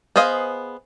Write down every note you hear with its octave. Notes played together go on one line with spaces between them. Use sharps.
B3 G#4 C5 D#5 F5